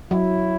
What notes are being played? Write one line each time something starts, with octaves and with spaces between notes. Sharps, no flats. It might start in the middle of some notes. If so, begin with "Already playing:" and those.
F#3 E4